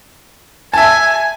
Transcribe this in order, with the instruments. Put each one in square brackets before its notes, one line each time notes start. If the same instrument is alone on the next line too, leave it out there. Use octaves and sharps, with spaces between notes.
[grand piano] E5 A5 [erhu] G#5